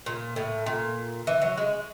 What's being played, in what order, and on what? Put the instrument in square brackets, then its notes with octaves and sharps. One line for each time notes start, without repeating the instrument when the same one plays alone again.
[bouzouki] A#2
A2
A#2
E3
F#3
G#3